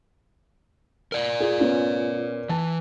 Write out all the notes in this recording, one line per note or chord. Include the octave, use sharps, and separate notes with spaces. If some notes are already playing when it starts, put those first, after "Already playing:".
A#4 D5
F4 G#4
B3 C#4 F4
E3 A5